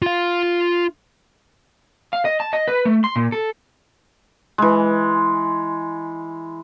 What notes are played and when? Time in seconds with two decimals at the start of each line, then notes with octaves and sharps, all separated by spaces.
0.02 F4 F5
2.13 F5
2.25 D#5
2.40 A5
2.53 D#5
2.68 B4
2.85 A3
3.04 C6
3.16 A#2
3.32 A4
4.58 E3 G#3